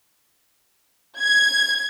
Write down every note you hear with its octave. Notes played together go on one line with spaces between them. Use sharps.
G#6